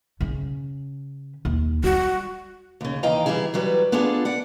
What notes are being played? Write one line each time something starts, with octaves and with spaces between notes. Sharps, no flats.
C#3 C#4
D#2
G3 F#4
D#2 C#3
D#2 E3 D#5 F5 G5 A#5
E3 G3 B3 E4 G#4
E3 F#3 G3 B4
B3 D4 F4 G#4 A4
D5 F#5